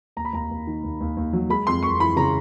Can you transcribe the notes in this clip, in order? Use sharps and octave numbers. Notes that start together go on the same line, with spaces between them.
D#2 A#5
B5
D#2 A#5
D#2
D#3
D#2
D#2
D#2
F#3
G#3 B5
F2 C6
F2 C#6
E3 B5
C#3 A#5